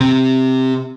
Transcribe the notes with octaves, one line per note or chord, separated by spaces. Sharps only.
C3